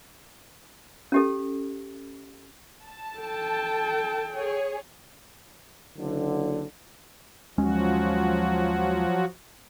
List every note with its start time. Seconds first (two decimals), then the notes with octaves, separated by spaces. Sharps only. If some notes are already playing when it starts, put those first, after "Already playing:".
1.12 C#4 G4 A4
2.85 A5
3.18 A4 G5
4.36 G#4 C#5
5.97 F#1 D3
7.58 D#2 F3 F#3 G#3 C#4 F#4